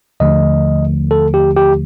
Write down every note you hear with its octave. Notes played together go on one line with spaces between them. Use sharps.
D#2 D3 F3 A3 D#5
A4
G4
G4